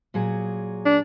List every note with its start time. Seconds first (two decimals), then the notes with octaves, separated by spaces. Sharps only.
0.14 A#2 F#3 G#4
0.86 D4